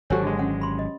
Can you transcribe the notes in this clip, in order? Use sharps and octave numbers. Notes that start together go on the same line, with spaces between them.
G#1 F#3 F#4 G4 A4 C5 C#5 G#5
D3 G#3
C#4 F#5
B5 C6
D#5